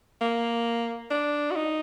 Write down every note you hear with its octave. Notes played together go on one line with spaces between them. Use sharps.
A#3
D4
F#4
D#4